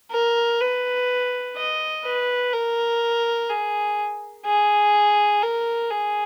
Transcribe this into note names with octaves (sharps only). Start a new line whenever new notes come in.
A#4
B4
D#5
B4
A#4
G#4
G#4
A#4
G#4